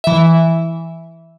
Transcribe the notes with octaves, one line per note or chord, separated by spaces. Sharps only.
E3 E5